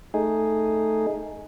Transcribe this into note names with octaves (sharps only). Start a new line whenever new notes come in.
A3 D#4 G#4